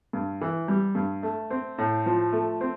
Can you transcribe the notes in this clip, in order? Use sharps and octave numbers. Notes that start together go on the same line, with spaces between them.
G2
E3
G3
G2
A3
C4
A2
F3
A3
C4